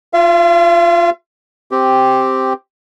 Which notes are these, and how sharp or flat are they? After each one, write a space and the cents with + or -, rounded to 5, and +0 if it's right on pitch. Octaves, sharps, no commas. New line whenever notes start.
F4 +0 F5 -45
C4 +0 G4 +0